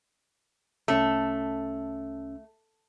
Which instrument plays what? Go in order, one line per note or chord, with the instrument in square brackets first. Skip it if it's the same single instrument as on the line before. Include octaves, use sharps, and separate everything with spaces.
[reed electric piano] C2 C#4 E6 [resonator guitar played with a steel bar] A3